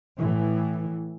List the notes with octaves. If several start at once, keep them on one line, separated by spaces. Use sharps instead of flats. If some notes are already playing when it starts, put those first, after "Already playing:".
A2 E3